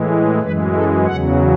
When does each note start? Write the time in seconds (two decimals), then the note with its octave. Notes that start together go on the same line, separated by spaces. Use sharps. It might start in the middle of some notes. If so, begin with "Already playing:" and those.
Already playing: A2 E3 G#3
0.42 F#2 E3 G#3 B4
0.74 A4
1.07 E2 C#3 F#3 F#5